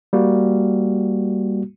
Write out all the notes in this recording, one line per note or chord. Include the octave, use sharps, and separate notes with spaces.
G3 A#3 F#4